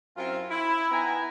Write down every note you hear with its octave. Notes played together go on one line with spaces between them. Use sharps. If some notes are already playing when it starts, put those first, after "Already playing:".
F#2 C4 E4 F4
E4
D#3 B3 E4 G#5 A#5